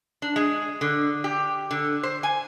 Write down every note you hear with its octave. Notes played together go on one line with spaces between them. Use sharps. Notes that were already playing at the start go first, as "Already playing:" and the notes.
D4
G#3
D3
G4
D3
C5
G#5